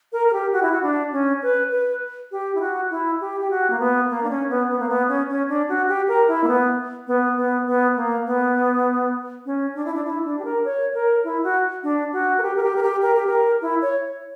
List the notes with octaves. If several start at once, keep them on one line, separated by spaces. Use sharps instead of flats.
A#4
A#4
G4
F#4
E4
F#4
D4
C#4
B4
B4
G4
E4
F#4
E4
G4
G4
F#4
A#3
B3
A#3
D4
C#4
B3
B3
A#3
B3
C#4
C#4
D4
F#4
G4
A#4
E4
A#3
B3
B3
B3
B3
A#3
B3
C#4
D4
E4
D4
E4
D4
G4
A#4
C#5
A#4
E4
F#4
D4
F#4
A#4
G4
A#4
G4
A#4
G4
A#4
G4
A#4
E4
C#5